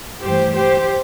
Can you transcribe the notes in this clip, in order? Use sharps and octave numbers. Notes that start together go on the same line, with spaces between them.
G2 E3 A3 G4 C5
G4 C5